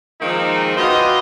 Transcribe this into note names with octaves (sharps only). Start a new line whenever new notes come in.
D#3 F3 G#3 A#3 C4 D#4
F4 F#4 B4 D5 D#5 G5